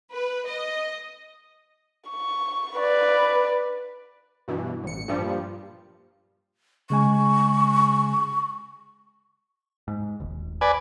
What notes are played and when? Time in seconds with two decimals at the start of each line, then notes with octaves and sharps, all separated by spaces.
0.12 B4
0.46 D#5
2.10 C#6
2.78 B4 D5
4.48 G2 B2 E3
4.84 A1 C#7
5.08 G2 A#2 F3 G3
6.90 C#3 G#3 G#5 C#6
9.88 G#2
10.20 D#1 G#1
10.61 B4 D5 G#5